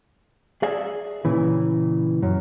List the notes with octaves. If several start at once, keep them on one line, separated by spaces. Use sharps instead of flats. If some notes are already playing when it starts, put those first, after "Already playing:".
G#4 D5 E5 F5 G#5
A#2 C#3 E3
F#2